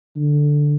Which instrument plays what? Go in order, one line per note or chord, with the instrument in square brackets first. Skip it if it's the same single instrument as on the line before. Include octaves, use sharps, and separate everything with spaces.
[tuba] D3